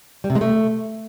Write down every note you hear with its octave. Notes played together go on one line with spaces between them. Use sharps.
G3
C3
G#3
A3